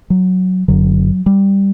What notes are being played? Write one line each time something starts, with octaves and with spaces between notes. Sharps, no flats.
F#3
F#1 F#2 D3 F#3
G3